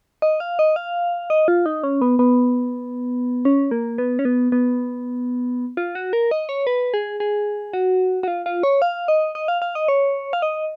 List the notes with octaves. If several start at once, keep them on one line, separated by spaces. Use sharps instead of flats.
D#5
F5
D#5
F5
D#5
F4
D#4
C#4
B3
B3
C#4
A#3
B3
C#4
B3
B3
F4
F#4
A#4
D#5
C#5
B4
G#4
G#4
F#4
F#4
F4
F4
C#5
F5
D#5
D#5
F5
F5
D#5
C#5
F5
D#5